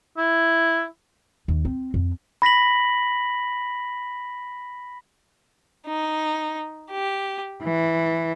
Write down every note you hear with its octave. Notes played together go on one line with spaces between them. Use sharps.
E4
D#2
C4
F2
B5 A#6 B6 F#7
D#4
G4
E3